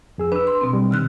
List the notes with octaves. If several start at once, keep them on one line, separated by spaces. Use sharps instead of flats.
F2 G#4 E6
D4 B4 E6
C6
B2 C4
G3
C3 D#3 F6 F#6